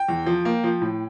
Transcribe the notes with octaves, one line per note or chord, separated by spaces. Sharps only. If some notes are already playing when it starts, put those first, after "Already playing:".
Already playing: G5
E2
F3
A#3
F3
A2